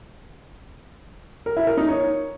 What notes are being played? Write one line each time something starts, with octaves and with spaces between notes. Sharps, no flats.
A#4
E4
A#4
D#4
C#5